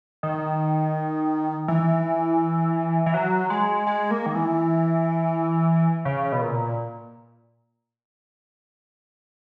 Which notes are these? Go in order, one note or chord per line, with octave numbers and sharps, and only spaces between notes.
D#3
E3
E3
F#3
G#3
G#3
A#3
D#3
E3
C#3
B2
A#2